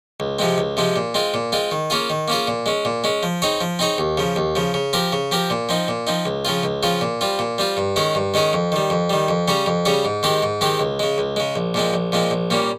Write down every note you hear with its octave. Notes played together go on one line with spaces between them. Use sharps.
C#2
C3 F3 G#3 C4
C#2
C3 F3 G#3 C4
A#2
G#3 C4 F4
A#2
G#3 C4 F4
D#3
A#3 C#4 F4 G#4
D#3
A#3 C#4 F4 G#4
A#2
G#3 C#4
A#2
G#3 C#4
F3
C4 D#4 G#4 C#5
F3
C4 D#4 G#4 C#5
D#2
C#3 F3
D#2
C#3 F3
C#3
F3 C4 G4 A#4
C#3
F3 C4 G4 A#4
A#2
F3 C4 D#4
A#2
F3 C4 D#4
C#2
C#3 F3 C4 F4
C#2
C#3 F3 C4 F4
A#2
G3 C4 F4
A#2
G3 C4 F4
G2
D#3 G#3 C#4 G#4
G2
D#3 G#3 C#4 G#4
F2
D#3 G3
F2
D#3 G3
F2
C#3 G3 C#4 G#4
F2
C#3 G3 C#4 G#4
G#2
D#3 G#3 C4 G4
G#2
D#3 G#3 C4 G4
C#2
C#3 G#3
C#2
C#3 G#3
A#1
A#2 F3 G#3 C4
A#1
A#2 F3 G#3 C4
A#1
A#2 G3 A#3 C#4